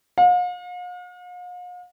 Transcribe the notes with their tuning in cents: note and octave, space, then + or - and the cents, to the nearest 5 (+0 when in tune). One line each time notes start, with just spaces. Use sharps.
F5 +45